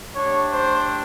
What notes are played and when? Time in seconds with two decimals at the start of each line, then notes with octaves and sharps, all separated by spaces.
0.15 A3 D4 G4 C#5
0.53 C5